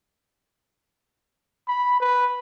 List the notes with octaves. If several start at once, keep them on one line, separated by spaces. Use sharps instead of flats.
B5
B4